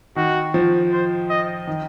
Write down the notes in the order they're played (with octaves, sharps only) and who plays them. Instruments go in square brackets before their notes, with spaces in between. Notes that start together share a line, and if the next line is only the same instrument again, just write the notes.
[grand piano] D#3 [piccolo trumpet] F#4
[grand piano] F3
[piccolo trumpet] C5
D#5
[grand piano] D#3